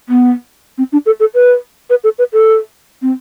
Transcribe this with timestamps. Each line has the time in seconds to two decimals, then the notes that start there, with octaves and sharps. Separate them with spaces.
0.09 B3
0.78 C4
0.92 D4
1.06 A4
1.20 A4
1.34 B4
1.90 B4
2.04 A4
2.19 B4
2.33 A4
3.02 C4